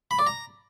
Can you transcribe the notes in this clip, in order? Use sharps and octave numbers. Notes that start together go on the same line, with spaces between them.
B5
D5
A#5